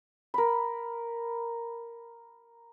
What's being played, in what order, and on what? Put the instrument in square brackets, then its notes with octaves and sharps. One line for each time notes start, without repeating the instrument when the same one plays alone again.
[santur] A#4 B5